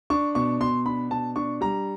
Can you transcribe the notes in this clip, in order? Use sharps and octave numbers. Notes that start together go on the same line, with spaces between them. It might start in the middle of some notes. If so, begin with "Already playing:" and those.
D4 C#6
B2 C#6
B2 C6
D4 B5
B2 A5
D4 C#6
G3 A#5